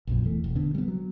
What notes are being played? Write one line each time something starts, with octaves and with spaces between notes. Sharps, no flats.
A#1 F#2 A#2
E1 E2 A3
E1
D3 B3
G3 B3
F#3